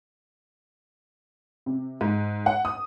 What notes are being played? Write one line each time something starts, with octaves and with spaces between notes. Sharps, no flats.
C3
G#2
F#5
D#6